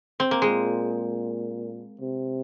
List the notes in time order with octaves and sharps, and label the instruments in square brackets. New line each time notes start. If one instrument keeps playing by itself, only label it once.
[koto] C4
A#3
[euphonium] A#2 [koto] G#3
[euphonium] C3